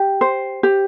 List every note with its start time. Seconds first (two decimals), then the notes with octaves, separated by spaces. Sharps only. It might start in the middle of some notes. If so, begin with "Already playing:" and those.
Already playing: G4
0.21 C5
0.63 G4